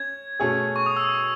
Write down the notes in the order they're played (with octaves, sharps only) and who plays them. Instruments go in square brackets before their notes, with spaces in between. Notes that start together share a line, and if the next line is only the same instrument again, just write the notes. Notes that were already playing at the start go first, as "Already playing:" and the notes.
Already playing: [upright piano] C#4 [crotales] G#6
[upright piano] B2 A3 C#4 G#4
[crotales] C#6
D#6
E6